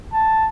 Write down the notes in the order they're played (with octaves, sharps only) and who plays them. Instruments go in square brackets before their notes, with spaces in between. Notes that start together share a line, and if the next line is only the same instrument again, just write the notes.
[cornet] A5